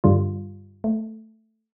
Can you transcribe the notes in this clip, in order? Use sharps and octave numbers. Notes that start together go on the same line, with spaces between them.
G2 D3 G3 F4
A3